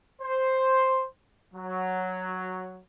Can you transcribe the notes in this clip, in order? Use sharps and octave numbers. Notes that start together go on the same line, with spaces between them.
C5
F#3